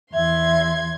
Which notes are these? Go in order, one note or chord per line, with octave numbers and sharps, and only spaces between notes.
E2 E5 C6 G#6